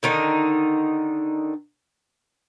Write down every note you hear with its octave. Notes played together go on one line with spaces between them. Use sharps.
D3 D#3 D#4